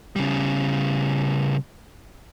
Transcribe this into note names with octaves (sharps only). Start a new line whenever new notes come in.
C#3 G3